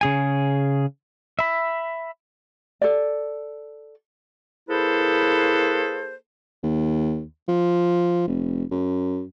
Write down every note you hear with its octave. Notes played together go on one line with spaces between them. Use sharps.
C#3 G#4 G#5
E5 B5
A4 D5
A#3 E4 G#4 A4 B4 C5
D#2
F3
F1
F#2